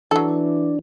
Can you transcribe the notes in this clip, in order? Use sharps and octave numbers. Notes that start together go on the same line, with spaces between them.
E3 F#3 D4 A4